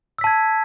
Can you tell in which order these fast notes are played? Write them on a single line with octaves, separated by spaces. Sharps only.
E6 B6 A5 G#6